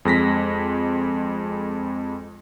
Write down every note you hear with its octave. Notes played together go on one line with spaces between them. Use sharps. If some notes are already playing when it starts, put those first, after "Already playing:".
F2 G#3 A#6 B6